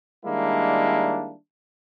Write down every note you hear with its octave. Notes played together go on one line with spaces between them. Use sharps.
D#3 G3 G#3 A#3 D4 E4